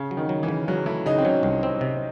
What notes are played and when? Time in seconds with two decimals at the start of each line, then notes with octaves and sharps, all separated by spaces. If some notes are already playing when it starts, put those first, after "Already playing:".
Already playing: C#3
0.11 F#3
0.17 D#3
0.29 F#3
0.43 E3
0.48 C#3
0.68 C#3 F#3
0.86 A3 E4
1.06 C#3 D#4
1.18 C4
1.25 F#3 C#4
1.43 C2
1.63 C4
1.81 C3